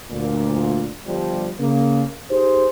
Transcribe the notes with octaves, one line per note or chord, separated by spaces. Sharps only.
D2 A#2
G1 F3 G3
C#3 A#3
D#4 G4 G#4 C5